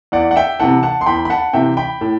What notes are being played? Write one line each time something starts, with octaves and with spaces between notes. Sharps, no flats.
E2 D5 F#5
F#5
E5 G5
C3 E3 F#5 A5
F#5 A5
C6
E2 G5 B5
B5
F#5 A5
C3 E3 E5 G5
G5 B5
A2